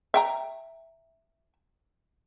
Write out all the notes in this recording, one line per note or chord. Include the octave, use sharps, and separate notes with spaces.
E5 G5 A#5